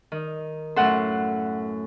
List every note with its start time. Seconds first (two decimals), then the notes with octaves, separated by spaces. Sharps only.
0.12 D#3
0.76 F#2 A2 A4 F#5 C6